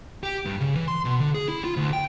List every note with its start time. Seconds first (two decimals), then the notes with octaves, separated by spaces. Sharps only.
0.23 G4
0.45 G2
0.60 C#3
0.75 E3
0.88 C6
1.05 B2
1.21 D3
1.34 G#4
1.48 E4
1.64 F4
1.76 D2
1.93 G5